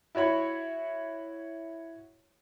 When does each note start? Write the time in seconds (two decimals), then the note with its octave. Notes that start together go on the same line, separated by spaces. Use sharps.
0.15 E4 F#4 C#5 B5